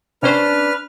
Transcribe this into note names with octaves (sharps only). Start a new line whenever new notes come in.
C3 C#4 D4 B4 C5 F6